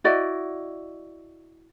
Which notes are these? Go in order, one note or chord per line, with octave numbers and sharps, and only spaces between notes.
E4 F#4 D5 D#5